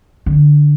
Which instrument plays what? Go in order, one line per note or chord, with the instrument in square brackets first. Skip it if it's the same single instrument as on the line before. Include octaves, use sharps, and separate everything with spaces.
[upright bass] D3